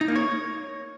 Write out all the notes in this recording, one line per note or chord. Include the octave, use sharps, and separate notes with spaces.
D#4
A#3
C#5